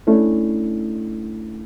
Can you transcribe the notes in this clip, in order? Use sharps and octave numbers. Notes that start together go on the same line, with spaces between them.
A3 C#4 D4 E4